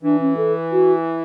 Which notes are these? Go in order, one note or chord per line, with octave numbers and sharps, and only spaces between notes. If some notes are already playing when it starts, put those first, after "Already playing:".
E3 D4
C#4
A4
F#4